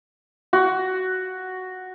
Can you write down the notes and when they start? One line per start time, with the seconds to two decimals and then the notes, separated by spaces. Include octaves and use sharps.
0.53 F#4